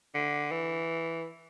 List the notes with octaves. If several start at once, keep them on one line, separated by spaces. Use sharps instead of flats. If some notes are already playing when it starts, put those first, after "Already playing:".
D3
E3